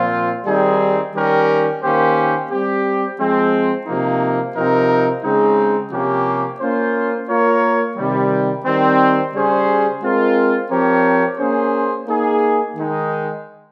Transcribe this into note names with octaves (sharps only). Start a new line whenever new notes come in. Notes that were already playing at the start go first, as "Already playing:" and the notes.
Already playing: A#2 F3 C4 F4
D#3 G3 C4 D#4 G#4
D#3 G3 C#4 G4 A#4
D#3 A#3 C#4 G4 C5
G3 C4 G4
F3 G#3 C4
C3 F3 A#3 D#4
C3 F3 C4 D#4 A#4
C#3 G#3 C4 D#4
C3 F3 A#3 C#4 G4
A#3 C#4 F4 C5
A#3 F4 A#4 C#5
C3 D#3 G3
D#3 G3 C4
C#3 G3 C#4 G#4 C5
G#3 C4 F4 A#4
F3 C4 G4 A#4 C#5
A#3 C#4 G#4 C5
A#3 D#4 G#4
D#3 G#3 D#4